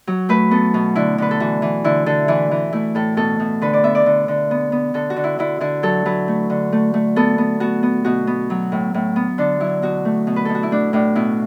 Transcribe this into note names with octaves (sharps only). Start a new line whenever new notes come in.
F#3
A3 B4
B3 A4
B2
D3 E4
D3 B4
A4
E3 F#4
E3
D3 E4
D3 A4
E3 E4
E3
A3 E4
A2 A4
B2 A4
B2
D3 B4
D5
B3 E5
D5
D3
D3
B3
B3
D3 A4
F#4
D3
E4
D3 E4
D3 E4
F#3 A4
F#3 B4
A3
D3
A3
A3
B3 A4
B3
B3 F#4
B3
B2 F#4
B3
F#3
A2
A2
B3
D3 D4
F#3 E4
B2 F#4
A3
B2
B4
B2 A4
F#4
E4
A3 D4
A2 D4
B2 E4